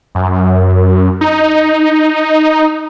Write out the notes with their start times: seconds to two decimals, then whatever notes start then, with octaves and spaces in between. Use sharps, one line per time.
0.15 F#2
1.21 D#4